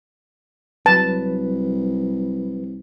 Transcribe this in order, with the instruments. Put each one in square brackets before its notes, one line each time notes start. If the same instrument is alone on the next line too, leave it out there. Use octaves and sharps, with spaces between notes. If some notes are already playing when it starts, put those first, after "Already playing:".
[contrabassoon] C2 [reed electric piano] F#3 B4 [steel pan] A5